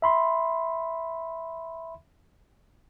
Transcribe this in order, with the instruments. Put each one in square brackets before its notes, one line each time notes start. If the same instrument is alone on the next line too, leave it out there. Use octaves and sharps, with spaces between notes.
[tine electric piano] E5 B5 C6